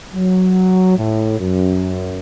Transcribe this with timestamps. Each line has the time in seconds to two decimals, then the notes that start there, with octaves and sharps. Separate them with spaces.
0.14 F#3
0.97 A2
1.39 F#2